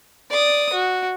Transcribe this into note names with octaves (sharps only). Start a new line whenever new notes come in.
D5 D#6
F#4